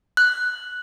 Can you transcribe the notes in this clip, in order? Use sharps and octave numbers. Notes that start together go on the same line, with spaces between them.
F#6